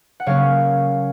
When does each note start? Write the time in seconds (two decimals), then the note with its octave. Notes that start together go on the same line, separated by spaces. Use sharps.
0.20 F#5
0.26 C#3 F#3 A#3 C#4 C#5 F5